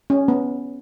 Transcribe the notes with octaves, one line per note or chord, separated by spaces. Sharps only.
C#4
B3